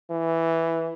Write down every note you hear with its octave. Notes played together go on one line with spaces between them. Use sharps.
E3